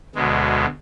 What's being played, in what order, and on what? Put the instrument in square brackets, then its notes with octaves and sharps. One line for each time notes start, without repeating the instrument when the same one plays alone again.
[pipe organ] D2 B2 G#3